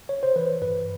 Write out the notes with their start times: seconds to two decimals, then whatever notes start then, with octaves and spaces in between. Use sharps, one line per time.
0.09 C#5
0.23 C5
0.36 E3 B4
0.61 G2 B4